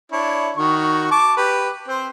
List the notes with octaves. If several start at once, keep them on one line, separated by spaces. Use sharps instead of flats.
D4 E4 C#5
D#3 F#4 C#6
A5 C#6 D6
G4 B4
C4 C5